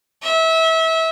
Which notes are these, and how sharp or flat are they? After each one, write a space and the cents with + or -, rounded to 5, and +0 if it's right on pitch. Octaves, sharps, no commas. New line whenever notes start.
E5 -25